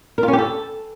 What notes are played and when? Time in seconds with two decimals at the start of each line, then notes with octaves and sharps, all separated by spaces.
0.18 A#4
0.23 F4
0.28 C#4
0.33 G4
0.38 A4